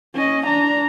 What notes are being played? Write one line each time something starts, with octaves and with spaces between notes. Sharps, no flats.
C#4 D#5
D4 A#5